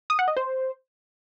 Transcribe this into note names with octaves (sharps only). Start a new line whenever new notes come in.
D#6
F#5
D#5
C5